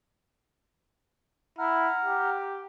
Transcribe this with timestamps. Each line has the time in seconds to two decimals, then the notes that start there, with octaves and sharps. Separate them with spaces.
1.59 E4 F#5 A#5 F6
2.05 G4